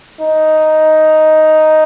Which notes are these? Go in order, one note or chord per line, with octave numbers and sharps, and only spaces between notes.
D#4